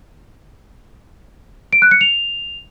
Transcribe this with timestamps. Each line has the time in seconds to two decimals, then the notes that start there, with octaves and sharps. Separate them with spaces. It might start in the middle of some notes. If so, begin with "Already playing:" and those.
1.73 D7
1.82 F#6
1.91 C#7
2.01 F7